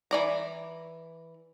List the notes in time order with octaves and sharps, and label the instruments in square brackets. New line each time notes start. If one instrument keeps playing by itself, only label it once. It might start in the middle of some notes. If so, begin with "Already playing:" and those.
[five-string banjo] E3 D5 A#5